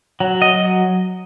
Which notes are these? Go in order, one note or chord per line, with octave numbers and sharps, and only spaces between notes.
F#3
D#5
F#3